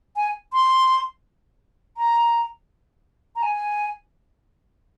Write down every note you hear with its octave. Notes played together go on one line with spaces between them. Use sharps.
G#5
C6
A#5
A#5
G#5